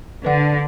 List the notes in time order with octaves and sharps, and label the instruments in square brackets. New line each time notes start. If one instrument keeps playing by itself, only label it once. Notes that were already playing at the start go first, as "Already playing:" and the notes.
[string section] D3 [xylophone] B4 D5 F#5